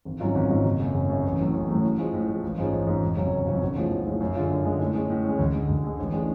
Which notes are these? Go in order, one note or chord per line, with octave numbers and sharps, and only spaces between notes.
G#1
G#2 F#3 C#4 F4
G#1
G#2 F#3 C#4 F4
F#1
F#2 C#3
F#1
F#2 C#3
A1
A2 F#3 A3
A1
A2 F#3 A3
A2
F3 G#3
A2
F3 G#3
A1
G#2 F3 G#3 C#4
A1
G#2 F3 G#3 C#4
F1
F2 C#3 F#3 C#4
F1
F2 C#3 F#3 C#4
B1
A2 F3 G#3
B1
A2 F3 G#3
F#2
D3 G#3 D4 F4
F#2
D3 G#3 D4 F4
A2
G#3 C#4
A2
G#3 C#4
D2
D3 G#3
D2
D3 G#3
A1
A2 G#3 D4